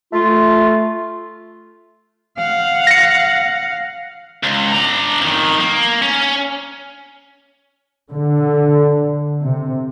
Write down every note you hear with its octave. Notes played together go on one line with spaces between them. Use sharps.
A3 F4
F5 F#5
A#6 C#7
C#2
D4 A#5
F2 D#3
A#3
C#4
D3
C3